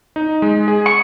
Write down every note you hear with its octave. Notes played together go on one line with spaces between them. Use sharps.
D#4
G#3
G#4
C#6